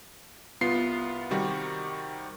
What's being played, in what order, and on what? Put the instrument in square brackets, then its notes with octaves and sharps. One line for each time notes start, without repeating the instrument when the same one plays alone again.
[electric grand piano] C2 B3 F4 C7
C3 D#3 G3 F#4